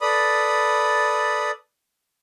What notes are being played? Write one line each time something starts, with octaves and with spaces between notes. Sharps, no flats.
A4 B4 D5 B5 D#6